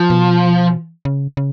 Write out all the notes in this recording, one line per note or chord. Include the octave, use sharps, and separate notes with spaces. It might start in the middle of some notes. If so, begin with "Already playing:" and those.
Already playing: F3
B2
C#3
C#3